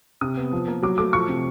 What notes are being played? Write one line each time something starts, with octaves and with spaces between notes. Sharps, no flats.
C3 D#6
B3
F3
A#3
F#3 D6
A3 D6
F3 C#6
C3